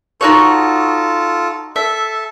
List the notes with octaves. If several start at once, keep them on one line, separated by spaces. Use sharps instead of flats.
D#4 F4 F#4 A4 C#5
A4 E5